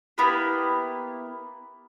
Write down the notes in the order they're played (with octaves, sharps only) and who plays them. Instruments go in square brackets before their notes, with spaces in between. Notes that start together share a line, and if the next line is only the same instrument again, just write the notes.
[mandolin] A#3 B3 E4 G4